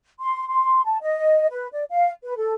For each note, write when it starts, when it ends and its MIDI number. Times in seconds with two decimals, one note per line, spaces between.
0.20 0.48 84
0.48 0.84 84
0.85 0.97 81
1.01 1.47 75
1.51 1.67 71
1.72 1.84 74
1.90 2.10 77
2.23 2.33 71
2.37 2.54 69